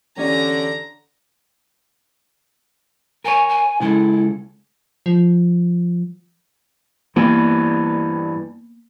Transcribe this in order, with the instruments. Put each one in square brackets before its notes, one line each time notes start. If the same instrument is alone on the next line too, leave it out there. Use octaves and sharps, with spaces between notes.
[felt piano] E2 G4 D5 [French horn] D3 [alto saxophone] C#4 [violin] A#5
[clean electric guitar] A#4 C#5 [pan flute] G#5
[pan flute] G#5
[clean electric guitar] C#2 G#3 A4 [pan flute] E4
[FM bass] F3
[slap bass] G2 E3 [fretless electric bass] A#3 B3